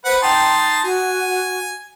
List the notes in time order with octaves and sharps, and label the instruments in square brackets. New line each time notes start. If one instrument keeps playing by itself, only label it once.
[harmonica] B4 F#5 [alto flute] C5
[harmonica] D#4 A5 C6 [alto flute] G5
[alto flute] F#4 [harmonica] G#5